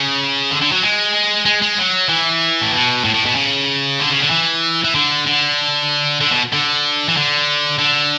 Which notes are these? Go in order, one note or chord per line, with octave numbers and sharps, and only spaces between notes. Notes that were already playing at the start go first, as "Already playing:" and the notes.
Already playing: C#3
D3
D3
F#3
G#3
G#3
G#3
F#3
E3
A2
B2
A2
A2
B2
C#3
D3
C#3
D3
E3
E3
D3
D3
D3
B2
D3
E3
D3
D3